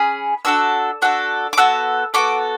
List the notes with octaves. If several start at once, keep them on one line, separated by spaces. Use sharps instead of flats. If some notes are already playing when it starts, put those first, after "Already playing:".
Already playing: C#4 G#4 B5
D4 F#4 A4 E6
D4 F#4 A4
D6
B3 F#4 A4 E6
B3 F#4 A4 D6